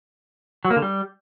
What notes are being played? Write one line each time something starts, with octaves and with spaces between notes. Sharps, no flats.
F#3
A#3
D3
G3